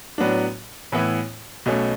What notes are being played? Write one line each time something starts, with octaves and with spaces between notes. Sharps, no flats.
A2 F#3 B3 D4
A2 E3 B3 E4
B1 B2 A3 C#4